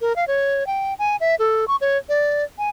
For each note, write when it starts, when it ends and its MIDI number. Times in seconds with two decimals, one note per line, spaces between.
0.01 0.15 70
0.16 0.25 77
0.28 0.66 73
0.67 0.94 79
0.99 1.16 80
1.20 1.35 76
1.39 1.65 69
1.68 1.76 85
1.81 1.98 73
2.09 2.44 74
2.58 2.69 80